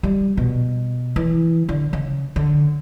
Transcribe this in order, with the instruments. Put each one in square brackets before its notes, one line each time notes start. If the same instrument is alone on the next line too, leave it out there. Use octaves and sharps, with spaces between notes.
[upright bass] G3
B2
E3
D3
C#3
D3